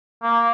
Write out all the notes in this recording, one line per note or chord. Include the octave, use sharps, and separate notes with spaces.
A#3